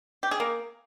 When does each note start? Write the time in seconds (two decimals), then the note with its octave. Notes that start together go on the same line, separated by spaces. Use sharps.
0.23 G4
0.31 G#4
0.40 A#3